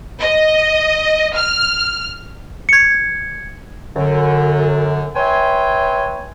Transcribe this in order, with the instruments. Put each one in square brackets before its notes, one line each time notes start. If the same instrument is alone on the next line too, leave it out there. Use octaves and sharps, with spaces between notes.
[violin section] D#5
F6
[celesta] G#6 C#7
[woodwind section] F#2 D3
B4 C#5 E5 G5 G#5 C6